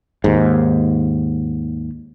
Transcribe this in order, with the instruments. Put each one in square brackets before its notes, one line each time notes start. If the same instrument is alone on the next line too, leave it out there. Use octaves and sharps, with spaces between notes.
[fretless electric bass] D#2 G#2